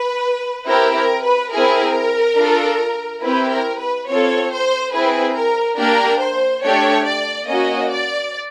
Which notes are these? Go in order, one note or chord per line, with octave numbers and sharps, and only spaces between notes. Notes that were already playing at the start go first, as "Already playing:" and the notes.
Already playing: B4
C4 E4 G4 A#4
A#4
B4
C4 E4 G#4 A#4
D4 F4 A4
C4 E4 G4 B4
A#4
B4
C4 F4 A4 C#5
C5
C4 E4 G#4 B4
A#4
A#3 D4 G4 A#4
C5
A3 D4 G4 C#5
D5
A#3 C#4 F#4 D#5
D5